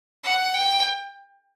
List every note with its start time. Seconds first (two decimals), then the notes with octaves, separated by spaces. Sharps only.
0.23 F#5
0.54 G5